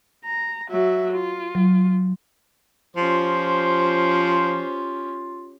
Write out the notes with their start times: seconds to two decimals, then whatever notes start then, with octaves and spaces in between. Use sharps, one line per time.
0.25 A#5
0.70 F#3 E5
1.14 F4
1.55 F#3
2.97 F3 C#4 F4 G4 C5